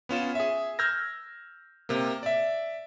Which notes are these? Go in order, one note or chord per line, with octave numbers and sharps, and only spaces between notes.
B3 C#4 F4 E7
G#4 E5
E6 F6 G6 G#6 A#6
C3 A#3
D5 E5